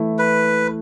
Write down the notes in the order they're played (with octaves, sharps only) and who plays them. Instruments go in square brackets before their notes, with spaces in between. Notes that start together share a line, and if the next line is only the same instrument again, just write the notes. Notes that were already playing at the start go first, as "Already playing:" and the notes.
Already playing: [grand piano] E3 A3 E4
[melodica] B4